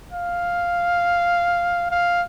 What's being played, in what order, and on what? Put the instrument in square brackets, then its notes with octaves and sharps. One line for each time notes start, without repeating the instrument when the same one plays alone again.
[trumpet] F5
F5